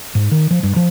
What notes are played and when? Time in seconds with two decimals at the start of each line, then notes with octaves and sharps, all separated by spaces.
0.15 G#2
0.31 D#3
0.51 F3
0.63 G2
0.76 F3